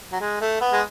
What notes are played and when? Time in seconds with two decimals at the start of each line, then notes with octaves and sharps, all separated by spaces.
0.12 F#3
0.20 G#3
0.41 A3
0.61 B3
0.73 G#3